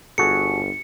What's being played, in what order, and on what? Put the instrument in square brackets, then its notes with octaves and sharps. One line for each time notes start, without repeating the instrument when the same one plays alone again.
[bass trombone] G1 [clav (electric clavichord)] F#4 G#4 A4 [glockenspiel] C#7